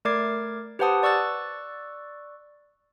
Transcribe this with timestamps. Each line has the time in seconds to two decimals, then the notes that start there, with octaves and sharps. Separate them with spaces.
0.05 A3 A#4 D5 D6 G#6 C7
0.79 G4 B4 C5 F#5 A5 D#6
1.03 D5 C#6 E6 F#6 A6